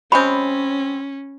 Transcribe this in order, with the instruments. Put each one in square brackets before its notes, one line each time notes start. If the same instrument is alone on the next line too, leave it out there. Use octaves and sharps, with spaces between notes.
[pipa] F#3 G#3 C4 [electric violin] C#4 [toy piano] B5